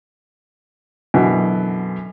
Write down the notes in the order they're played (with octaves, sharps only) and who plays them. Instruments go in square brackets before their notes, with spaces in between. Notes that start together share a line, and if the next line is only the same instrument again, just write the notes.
[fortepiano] F#2 B2 D3 E3